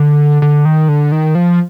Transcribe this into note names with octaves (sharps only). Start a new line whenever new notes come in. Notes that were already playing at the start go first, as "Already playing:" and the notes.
Already playing: D3
D3
D#3
D3
D#3
F3